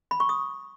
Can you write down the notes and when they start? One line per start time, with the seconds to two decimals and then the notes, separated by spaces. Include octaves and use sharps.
0.11 B5
0.20 C#6
0.29 D#6